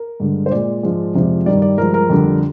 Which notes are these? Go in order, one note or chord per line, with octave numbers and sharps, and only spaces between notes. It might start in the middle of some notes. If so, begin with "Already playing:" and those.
Already playing: A#4
G2 D3 G#3
C5
A#2 G#3 D5
G#2 F3 G#3
F2 C3 F3 G#3
G2 D#3 G3 D5
D5
G2 F3 G#3 A#4
A#4
F2 D3 G3